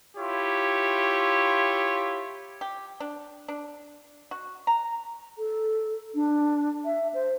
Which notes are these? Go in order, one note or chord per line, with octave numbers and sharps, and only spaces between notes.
E4 F4 G4 C#5
G4
D4
D4
F#4
A#5
A4
D4
E5
C5